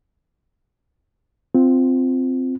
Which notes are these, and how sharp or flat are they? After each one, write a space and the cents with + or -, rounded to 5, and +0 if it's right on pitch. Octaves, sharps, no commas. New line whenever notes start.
C4 -10 F4 +0